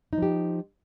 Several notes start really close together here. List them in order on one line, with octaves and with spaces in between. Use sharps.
D#4 F3 G4